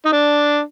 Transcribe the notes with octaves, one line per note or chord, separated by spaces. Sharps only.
D#4
D4